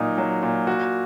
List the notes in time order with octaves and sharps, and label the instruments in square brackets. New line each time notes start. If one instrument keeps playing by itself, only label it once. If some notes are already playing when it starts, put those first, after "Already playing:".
Already playing: [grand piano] A#2 F#3 D#4
F#3
A#2
F#4